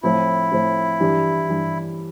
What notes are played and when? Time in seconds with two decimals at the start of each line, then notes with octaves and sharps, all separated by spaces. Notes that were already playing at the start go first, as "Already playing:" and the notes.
0.03 A2 F3 C4 E4
0.52 A2 F3 C4
1.00 G2 E3 G3 D4
1.49 G2 E3 G3 D4